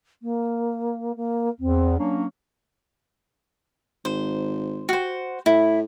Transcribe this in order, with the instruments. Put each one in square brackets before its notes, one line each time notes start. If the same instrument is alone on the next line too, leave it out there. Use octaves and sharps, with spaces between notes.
[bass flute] A#3
A#3
[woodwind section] E2 [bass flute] C4
[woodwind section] F#3 A#3 C#4 [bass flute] D4
[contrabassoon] G#1 [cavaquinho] C5
[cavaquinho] F#4 C5
[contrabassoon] A2 [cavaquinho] E4